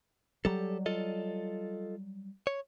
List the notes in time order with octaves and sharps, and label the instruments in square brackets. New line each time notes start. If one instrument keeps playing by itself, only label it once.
[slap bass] F#3 G3 [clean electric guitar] G4 A4
[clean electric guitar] F4 A4 D#5
C#5